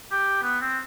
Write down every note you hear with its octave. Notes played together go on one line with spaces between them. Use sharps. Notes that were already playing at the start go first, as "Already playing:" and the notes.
G4
B3
C4